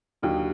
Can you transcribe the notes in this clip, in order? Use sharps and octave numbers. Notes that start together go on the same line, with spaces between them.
D#2 D3 F#3